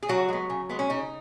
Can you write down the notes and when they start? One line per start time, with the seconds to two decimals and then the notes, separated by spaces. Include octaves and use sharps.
0.03 G#4
0.08 C#3 F#3 F#4
0.28 G#3 B3
0.50 C#3
0.69 G#3 B3
0.79 C#4
0.90 C#3 D#4